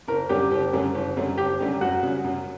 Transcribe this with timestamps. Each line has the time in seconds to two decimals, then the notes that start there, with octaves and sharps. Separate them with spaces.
0.08 F#1 A#4
0.29 F#2 D3 G3 C#4 G4
0.51 F#1
0.73 F#2 D3 G3 C#4
0.95 F#1
1.16 F#2 D3 G3 C#4
1.38 F#1 G4
1.59 F#2 D3 G3 C#4
1.81 F#2 F#4
2.03 C#3 G3 C#4
2.24 F#2